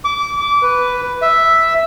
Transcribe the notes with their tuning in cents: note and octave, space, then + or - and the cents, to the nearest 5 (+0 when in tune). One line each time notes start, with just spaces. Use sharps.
D6 -25
B4 +5
E5 +0